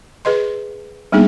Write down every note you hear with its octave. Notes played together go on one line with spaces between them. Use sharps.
G#4 B4 D#5 C6
G3 A#3 B3 D4 D#4 G#4